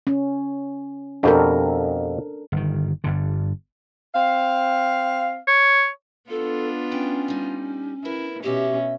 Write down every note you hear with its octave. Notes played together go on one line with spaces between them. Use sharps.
C#4
F2 B2 D4 G4 A4 A#4
G1 D#3
G1 G2 D3
C4 F5
C#5
B3 D4 F4 A4
C#4 G5
G3 D#4
B3 E4 A#4
B2 C#4 G4 D#5 E5